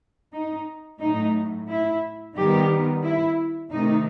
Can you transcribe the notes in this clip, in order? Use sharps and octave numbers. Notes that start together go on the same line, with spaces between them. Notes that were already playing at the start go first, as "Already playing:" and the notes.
D#4
A2 F#3 A3 D#4
E4
D#3 G3 B3 G4
E4
C3 D#3 A3 D#4